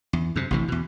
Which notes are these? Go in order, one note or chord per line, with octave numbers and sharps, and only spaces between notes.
E2
F#2 C3
A1 C3 E3
E2 B2